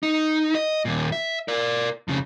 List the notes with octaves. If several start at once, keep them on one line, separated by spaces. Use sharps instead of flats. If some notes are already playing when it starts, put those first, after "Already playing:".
D#4
D#5
D#2 A#2
E5
A#4 D5
F2 C#3